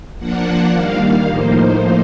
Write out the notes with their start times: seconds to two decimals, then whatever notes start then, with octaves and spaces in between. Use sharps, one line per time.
0.18 F3 A#3 D4 F#5
0.72 D#3 G3 A#3 F5
1.27 A2 F3 A#3 D#4 C5